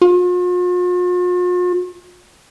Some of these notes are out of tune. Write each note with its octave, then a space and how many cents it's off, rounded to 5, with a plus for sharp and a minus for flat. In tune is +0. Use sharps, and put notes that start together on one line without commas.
F4 +45